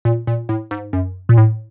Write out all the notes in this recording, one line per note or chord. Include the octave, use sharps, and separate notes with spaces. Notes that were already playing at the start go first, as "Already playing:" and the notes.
A#2
A#2
A2
G#2
F#2
A#2
A2